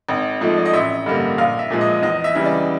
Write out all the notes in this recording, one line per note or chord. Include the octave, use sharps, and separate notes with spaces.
G#1
G#2 F3 A3
D5
D#5
A1 E5
G2 D3 G3 A#3
A#1 F5
E5
A#2 F3 G#3
D#5
E2 D#5
E5
C#3 E3 G3
D5